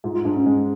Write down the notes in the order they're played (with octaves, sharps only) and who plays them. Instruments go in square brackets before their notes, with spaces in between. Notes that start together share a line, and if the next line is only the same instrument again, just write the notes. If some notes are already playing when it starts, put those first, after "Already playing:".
[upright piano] G#2 [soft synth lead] F4
[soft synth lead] F4
[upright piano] G#2 [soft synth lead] D4
[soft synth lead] C#4
[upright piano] G#3